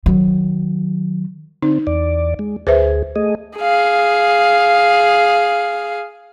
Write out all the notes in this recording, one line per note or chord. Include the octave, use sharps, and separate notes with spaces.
D#3 F#3
D3 C4 D#4
E2 D5
G#3
D2 G#4 B4 C5 E5
A3 G#4 D#5
G#4 F5